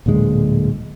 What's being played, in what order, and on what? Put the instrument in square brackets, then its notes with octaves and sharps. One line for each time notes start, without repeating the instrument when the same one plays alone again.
[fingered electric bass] D1 A#2 D3 G#3